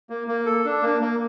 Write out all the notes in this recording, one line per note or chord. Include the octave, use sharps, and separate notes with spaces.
A#3
A#3
A4
D4
A#3
A#3